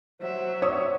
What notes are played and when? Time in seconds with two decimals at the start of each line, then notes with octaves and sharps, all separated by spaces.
0.20 F#3 C5 E5
0.62 C4 C#5 D5 D#6 E6